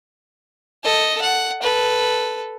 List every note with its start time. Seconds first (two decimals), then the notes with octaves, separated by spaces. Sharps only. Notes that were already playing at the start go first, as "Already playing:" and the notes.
0.83 A4 D#5
1.22 F#5
1.63 A4 B4